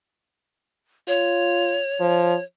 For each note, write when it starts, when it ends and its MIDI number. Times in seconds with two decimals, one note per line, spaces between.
1.08 1.80 65
1.08 2.43 73
2.00 2.35 53